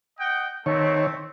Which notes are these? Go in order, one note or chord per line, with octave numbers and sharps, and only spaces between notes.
D#5 F#5 G5
D#3 A3 C4 C#5